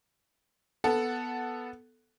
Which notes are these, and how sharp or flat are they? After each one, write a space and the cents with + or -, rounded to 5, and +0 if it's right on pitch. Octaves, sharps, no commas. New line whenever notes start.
B3 +0 A4 +0 F#5 +0